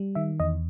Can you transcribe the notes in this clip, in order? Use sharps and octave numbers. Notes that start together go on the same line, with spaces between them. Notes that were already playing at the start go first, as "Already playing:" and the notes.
Already playing: G3
D#3 E5
E2 D#5